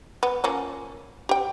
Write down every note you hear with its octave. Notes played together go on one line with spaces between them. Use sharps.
B3
F3 A#3 C#4
G4 G5